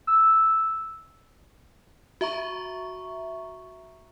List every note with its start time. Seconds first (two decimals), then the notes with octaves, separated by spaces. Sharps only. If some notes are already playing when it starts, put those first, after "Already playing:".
0.07 E6
2.21 F#4 E5 A#5 C#6